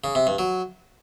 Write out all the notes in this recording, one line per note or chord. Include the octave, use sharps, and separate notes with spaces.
C#3
C3
G2
F#3